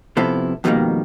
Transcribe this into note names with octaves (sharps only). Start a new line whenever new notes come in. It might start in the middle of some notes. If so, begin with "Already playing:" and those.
C3 F3 B3 E4 A4
F2 B2 D#3 E3 G3 A#3